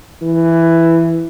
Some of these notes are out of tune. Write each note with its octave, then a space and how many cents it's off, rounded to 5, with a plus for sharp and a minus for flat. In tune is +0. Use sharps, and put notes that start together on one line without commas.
E3 +10